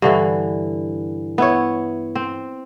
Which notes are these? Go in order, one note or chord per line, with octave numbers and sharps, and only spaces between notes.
G2 D3 E3
B3 E4 C#5
C4